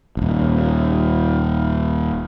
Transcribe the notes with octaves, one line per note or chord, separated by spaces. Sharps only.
D#1 G#1